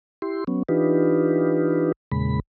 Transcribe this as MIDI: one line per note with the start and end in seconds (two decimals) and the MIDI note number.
0.22 0.44 64
0.22 0.44 67
0.22 0.44 84
0.47 0.63 54
0.47 0.63 59
0.47 0.63 61
0.69 1.92 52
0.69 1.92 62
0.69 1.92 63
0.69 1.92 65
0.69 1.92 67
0.69 1.92 71
2.12 2.40 40
2.12 2.40 46
2.12 2.40 49
2.12 2.40 56
2.12 2.40 83